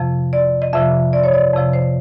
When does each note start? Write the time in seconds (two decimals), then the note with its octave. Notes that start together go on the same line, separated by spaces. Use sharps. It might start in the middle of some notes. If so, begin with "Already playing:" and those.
Already playing: F2 C3 F3
0.33 D5
0.62 D#5
0.73 F2 C3 F3 E5
1.13 D5
1.23 C#5
1.34 D5
1.53 F2 C3 F3
1.73 C5